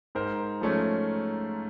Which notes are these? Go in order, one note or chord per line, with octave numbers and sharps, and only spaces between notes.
G#2 A#4 C5
F3 A3 C#4